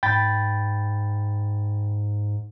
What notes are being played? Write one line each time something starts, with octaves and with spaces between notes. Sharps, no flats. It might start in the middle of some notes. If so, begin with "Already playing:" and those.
G#2 G5 B5 A6